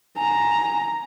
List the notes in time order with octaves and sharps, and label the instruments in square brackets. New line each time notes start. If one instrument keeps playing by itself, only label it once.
[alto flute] G#5 [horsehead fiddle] A#5